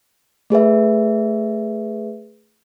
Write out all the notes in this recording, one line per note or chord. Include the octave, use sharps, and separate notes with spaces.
A3 G#4 B4 E5